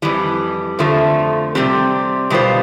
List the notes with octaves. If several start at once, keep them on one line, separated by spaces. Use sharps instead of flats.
F2 E3 G3
F2 D3 F3 A3
C3 G3 C4 G4
B2 G3 B3 F4 C5